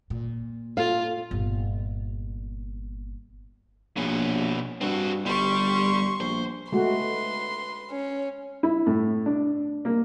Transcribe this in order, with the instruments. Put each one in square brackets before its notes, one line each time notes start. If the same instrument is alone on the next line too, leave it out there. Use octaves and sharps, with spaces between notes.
[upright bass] A#2
[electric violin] F4 [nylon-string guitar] A4 F5
[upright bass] G1 A#2
[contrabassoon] A#1 [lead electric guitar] B2 C#4
[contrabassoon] G2 [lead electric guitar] C4 F#4
[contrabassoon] G1 [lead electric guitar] G3 [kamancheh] C6 C#6
[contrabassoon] A#1 [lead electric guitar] C5
[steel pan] G#3 A3 F#4 [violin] B4 C6
[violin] C#4
[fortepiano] E4
A2
D4
A#3